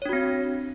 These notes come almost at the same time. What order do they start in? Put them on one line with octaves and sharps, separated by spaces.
C#5 D4 F#4 C4